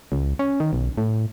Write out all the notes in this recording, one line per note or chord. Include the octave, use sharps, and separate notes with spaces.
C#2
C#4
D#3
B1
A2